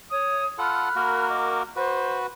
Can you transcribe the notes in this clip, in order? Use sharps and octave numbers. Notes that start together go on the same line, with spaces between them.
C#5 D#6
F4 A4 F#5 B5 F6 F#6
A#3 F#4 A#4
D#5 D6
F#4 B4 C5